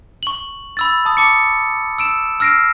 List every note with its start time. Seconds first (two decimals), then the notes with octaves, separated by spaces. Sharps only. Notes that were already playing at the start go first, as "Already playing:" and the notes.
0.23 C#6 F#7
0.77 B5 E6 A6
1.05 A5 D#6
1.17 A5 D6 C#7
1.99 E6 D7 E7
2.40 E6 F6 A#6 C7 D7